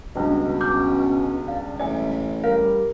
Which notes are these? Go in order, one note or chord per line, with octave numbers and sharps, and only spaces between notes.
C#2 G2 B2 D#5
C#4 D6 F6 G6
D5 F5
A1 D5 E5 G#5
G3 A#4 F5